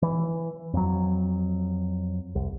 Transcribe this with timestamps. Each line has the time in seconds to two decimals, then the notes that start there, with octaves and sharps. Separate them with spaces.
0.02 E3
0.73 F2 F#3
2.35 C2